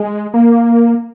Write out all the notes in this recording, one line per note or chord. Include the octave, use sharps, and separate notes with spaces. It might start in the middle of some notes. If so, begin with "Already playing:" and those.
Already playing: G#3
A#3